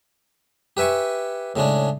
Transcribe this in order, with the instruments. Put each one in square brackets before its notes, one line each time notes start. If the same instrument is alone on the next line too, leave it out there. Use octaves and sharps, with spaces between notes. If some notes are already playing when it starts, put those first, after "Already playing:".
[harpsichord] G4 B4 E5 G#5 C#6
A2 C#3 G#3 D4